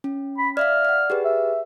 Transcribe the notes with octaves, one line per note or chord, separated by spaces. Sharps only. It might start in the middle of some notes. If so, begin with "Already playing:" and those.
C#4
B5
D5 E5 F5 F6
D5 F#5
G4 G#4 B4
E5